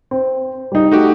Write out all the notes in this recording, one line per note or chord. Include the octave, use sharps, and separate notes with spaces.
C4
G3 D#4
A3 D#4 F#4 G4